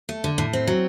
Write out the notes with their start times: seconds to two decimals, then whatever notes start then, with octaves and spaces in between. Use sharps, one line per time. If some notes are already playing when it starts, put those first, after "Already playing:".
0.09 A3
0.24 D3
0.38 A2
0.53 C4
0.67 F#3